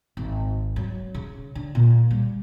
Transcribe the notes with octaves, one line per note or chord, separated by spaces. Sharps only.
G#1
F#3
C#3
D3
A#2
G3